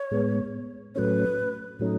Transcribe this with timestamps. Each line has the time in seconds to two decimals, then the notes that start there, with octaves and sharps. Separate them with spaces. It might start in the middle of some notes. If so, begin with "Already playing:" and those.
Already playing: C#5
0.11 A2 G#3 B3
0.95 A2 F#3 A3 C#4 B4 C#5
1.79 A2 F#3 A3 C#4 D#4